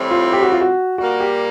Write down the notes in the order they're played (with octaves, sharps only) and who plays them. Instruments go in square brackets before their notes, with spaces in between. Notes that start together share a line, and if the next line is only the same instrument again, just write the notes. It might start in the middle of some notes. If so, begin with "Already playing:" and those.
Already playing: [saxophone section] A2 E3 G3 C4
[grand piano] F4
G4
F#4
F4
F#4
[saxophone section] A#2 G3 A#3 [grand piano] F#4
[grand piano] G4